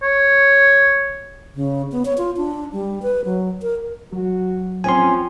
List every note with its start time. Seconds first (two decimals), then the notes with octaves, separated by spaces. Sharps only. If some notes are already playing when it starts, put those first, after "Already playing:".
0.03 C#5
1.55 C#3
1.92 B3
2.05 C#5
2.18 F4
2.37 D4
2.72 G3
3.02 B4
3.25 F#3
3.62 A#4
4.13 F#3 F#4
4.84 F3 C4 C#4 G#5 C6